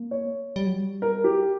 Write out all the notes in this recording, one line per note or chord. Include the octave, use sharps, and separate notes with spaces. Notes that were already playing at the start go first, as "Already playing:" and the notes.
Already playing: A#3
C#5
G3
F#3
G3
A#4
G4